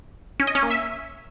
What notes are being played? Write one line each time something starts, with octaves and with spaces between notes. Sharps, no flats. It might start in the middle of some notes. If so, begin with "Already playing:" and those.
C#4
D#5
C#4
A#3
E5